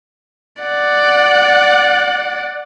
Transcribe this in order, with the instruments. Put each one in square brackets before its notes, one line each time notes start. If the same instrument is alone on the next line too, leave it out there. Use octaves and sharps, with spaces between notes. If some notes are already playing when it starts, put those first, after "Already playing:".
[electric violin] D5 F#5